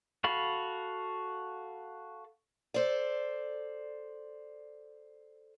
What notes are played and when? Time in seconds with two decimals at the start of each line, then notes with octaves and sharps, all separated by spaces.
0.24 F#4 A4 F5 B5
2.74 A4 C5 D5